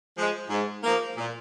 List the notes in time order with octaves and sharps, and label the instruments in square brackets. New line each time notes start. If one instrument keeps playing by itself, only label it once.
[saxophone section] F3 G#3
G#2
F3 A#3
A#2